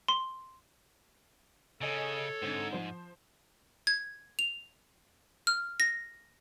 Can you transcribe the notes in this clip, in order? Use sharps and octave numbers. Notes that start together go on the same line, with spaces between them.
C6
C#3 A4 C#5 D#5 G#5 A6
G#2 D3 C4
F3 C5
G#6
F7
F6
A#6